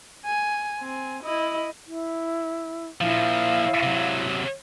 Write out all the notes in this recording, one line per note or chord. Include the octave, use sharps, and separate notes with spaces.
G#5
C4 G#5
E4 D#5
E4
A#2 F3 E4 F5
C3 F#3